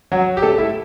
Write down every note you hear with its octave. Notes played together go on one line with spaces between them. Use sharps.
F#3 F#4
G4
A3 A4
E4 E5